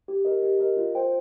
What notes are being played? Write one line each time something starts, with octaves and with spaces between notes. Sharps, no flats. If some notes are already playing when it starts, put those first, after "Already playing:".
G4
A#4 D#5
G4
A#4 D#5
F4
C5 G5